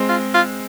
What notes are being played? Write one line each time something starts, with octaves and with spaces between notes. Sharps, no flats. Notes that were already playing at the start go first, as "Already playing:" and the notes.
Already playing: G#3 C4
F4
F4